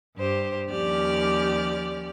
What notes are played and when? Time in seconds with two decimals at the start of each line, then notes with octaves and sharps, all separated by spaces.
0.16 G2 G4 C5
0.69 D#2 F3 C#4 G4 D5 F6